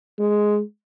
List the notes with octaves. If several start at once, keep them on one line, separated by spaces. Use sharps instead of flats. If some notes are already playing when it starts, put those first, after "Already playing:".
G#3